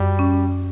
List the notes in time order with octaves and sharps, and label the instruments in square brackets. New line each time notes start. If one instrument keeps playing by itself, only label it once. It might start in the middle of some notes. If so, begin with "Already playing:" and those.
Already playing: [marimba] F#2 [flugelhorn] G3
[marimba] C#4